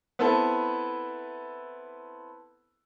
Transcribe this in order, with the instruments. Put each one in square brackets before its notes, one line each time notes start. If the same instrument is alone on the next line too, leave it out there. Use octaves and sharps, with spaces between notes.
[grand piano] B3 C4 E4 A4 B4